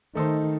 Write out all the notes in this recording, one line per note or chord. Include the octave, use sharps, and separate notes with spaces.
D#3 A3 D#4 A4 C5